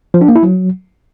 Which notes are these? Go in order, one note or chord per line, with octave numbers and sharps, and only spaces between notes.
F3
D4
A#3
E4
F#3